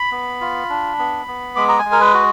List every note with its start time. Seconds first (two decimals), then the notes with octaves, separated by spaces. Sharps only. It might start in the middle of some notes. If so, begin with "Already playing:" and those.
Already playing: B5
0.11 B3
0.41 F4
0.69 D4
0.99 B3
1.28 B3
1.56 G#3 D6
1.69 A#5
1.79 G#5
1.85 G#3
1.92 A#4
2.00 B4
2.14 F#4